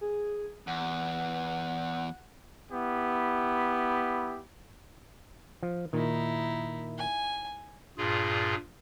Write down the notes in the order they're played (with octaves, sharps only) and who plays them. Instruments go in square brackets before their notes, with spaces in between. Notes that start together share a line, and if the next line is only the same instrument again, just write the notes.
[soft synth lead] G#4
[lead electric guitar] E2 [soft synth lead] F#5
[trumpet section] B3 E4 G4
[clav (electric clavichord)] F3
[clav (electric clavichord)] A#2 D#3 [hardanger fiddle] D#4 E4
[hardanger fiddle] G#5
[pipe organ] G2 A#2 F4 G#4